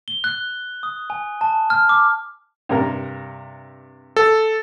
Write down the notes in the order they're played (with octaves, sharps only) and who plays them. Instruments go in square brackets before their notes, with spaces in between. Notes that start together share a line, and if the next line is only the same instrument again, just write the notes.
[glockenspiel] G7
F#6
D#6
G#5
A5
F6
D6
[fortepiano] G2 C3 A#4
[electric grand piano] A4